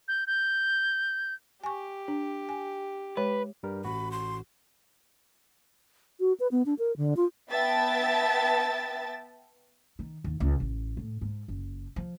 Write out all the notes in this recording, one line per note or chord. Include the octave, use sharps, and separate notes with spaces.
G6
G6
G4 G#5 C#6
D4
G#5
G#3 B4 C#5
G2 G3 A#4
A1 F#4 B5
C6
F#4
B4
B3
D4
A#4
D3
F4
B3 E5 G5 A5 A6
D#3
D#2
C#2
A1
A2
G#2
F#1
F3